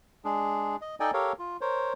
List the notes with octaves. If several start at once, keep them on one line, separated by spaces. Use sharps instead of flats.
G#3 D4 G#4
D#5
D#4 A4 D5 D#5 G5 G#5
G4 A4 A#4 C#5 F5
F4
A#4 C5 C#5